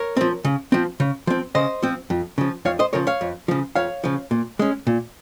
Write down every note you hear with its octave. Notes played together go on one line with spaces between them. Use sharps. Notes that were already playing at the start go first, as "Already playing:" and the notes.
Already playing: A#4 C#5
F3 C4
C#3
F3 C4
C#3
F3 C4
C#3 C5 D#5
F3 C4
F2
C#3 F3
F2 C#5 F5
C5 D#5
C#3 F3 A#4 C#5
C#5 F5
F2
C#3 F3
F2 C#5 F5
C#3 F3
A#2
G#3 C#4
A#2